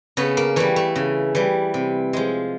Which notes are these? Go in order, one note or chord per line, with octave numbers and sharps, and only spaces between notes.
C#3 A3 B3
A#3
E3 G3 A3
A3
C#3
E3 G3
C3
F3 G#3